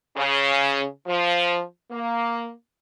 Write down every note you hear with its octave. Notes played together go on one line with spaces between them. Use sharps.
C#3
F3
A#3